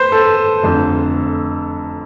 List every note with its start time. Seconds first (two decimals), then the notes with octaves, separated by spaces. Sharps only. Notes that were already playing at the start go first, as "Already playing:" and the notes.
Already playing: B4 C5
0.12 A4
0.63 F1 F2 D3